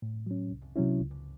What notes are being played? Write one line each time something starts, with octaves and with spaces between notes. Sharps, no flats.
A2
F#3 C#4
C2
C3 F#3 C#4 E4
C#2